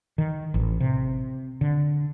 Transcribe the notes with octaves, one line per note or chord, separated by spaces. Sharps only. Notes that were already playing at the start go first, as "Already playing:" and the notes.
D#3
A1
C3
D3